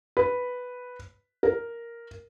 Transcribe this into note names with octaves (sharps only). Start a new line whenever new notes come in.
B4
A#4